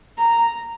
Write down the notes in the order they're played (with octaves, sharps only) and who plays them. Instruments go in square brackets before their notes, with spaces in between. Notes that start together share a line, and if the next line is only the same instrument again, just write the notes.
[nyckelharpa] A#5